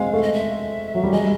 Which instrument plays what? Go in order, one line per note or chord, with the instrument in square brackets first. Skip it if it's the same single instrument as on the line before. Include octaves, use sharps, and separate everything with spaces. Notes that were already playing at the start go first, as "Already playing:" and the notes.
Already playing: [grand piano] G#3 C4 [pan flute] F5
[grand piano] A3
[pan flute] D#5
E5
[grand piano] F#3
G3
[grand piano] G#3 [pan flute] D#5